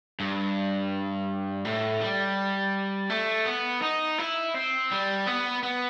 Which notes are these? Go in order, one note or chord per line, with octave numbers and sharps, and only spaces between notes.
G2
A2
G3
A3
B3
D#4
E4
C4
G3
B3
B3